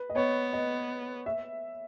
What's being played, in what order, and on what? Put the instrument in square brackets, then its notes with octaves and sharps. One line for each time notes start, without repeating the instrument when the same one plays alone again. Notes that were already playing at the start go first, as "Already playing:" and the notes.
Already playing: [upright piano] B4
D#5
[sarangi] B3 [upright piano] C#5
[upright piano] D#5
E5